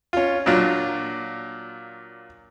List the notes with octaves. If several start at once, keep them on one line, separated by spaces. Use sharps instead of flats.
C#4 F4
A#2 F#3 D4 F4